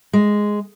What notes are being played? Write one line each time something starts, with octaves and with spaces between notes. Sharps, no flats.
G#3